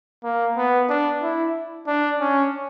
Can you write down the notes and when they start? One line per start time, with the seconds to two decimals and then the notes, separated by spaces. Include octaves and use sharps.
0.24 A#3
0.57 B3
0.89 D4
1.22 E4
1.87 D4
2.20 C#4